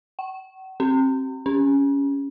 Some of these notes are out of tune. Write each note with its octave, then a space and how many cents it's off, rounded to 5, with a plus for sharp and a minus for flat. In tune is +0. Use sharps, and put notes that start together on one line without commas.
F#5 +45
C4 +25
C#4 +10